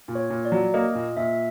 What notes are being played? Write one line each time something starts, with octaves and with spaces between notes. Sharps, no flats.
A#2
C#5
A#2
D5
F#3
A#3 D#5
A#2
A#2 E5